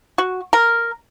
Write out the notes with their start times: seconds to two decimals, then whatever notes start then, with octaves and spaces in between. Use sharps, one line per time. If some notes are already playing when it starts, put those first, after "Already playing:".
0.18 F#4
0.53 A#4